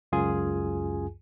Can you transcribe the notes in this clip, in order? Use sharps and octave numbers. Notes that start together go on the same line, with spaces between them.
C#2 F#2 F4 G#4 G#5